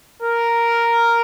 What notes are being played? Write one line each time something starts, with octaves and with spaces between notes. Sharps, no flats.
A#4